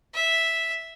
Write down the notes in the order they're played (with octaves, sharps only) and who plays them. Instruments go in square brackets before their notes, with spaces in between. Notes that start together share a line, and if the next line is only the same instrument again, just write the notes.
[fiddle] E5